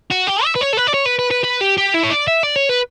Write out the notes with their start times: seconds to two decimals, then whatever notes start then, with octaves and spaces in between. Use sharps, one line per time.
0.10 F#4
0.27 G4
0.44 E5
0.55 B4
0.61 C#5
0.73 A4
0.77 B4
0.87 D5
0.94 C#5
1.06 B4
1.19 B4
1.31 B4
1.44 B4
1.61 G4
1.78 G4
1.94 E4
2.04 C#5
2.10 D5
2.28 E5
2.43 D5
2.56 C#5
2.69 B4